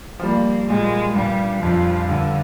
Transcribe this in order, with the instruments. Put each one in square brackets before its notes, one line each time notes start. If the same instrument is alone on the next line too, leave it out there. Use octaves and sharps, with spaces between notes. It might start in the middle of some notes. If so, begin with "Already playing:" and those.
[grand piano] F3
[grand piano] G3 [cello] A#3
[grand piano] A#2 [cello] G#3
[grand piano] G2 [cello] G3
[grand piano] F2 [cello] F3
[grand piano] G2 [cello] D3